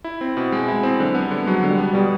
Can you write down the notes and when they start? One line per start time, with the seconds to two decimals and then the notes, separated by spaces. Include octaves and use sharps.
0.04 E4
0.21 C4
0.37 B2
0.52 G#3
0.68 E4
0.83 C4
0.99 D3 F#3
1.15 B3
1.23 G3
1.31 D3
1.46 F#3 G#3
1.63 D3
1.70 G3
1.78 B3
1.93 B2 G3